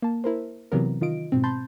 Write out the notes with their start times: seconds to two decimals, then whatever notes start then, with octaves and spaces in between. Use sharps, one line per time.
0.02 A#3 A5
0.24 E4 A#4 C5
0.72 C3 E3 F#3 B3 A#4
1.01 D#3 F4 D#5 D7
1.32 G#2 B2 C4
1.44 A5 B5 C6 G6 A6